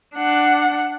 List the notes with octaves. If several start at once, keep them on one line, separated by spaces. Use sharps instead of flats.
D4 F#5